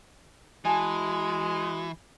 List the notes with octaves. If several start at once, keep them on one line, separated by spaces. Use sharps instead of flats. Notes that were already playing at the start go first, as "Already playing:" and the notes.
E3 G#3 F#4 G#5 A5